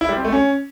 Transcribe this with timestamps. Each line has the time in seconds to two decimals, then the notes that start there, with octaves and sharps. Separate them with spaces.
0.01 E4
0.09 G3
0.17 C4
0.25 A3
0.32 C#4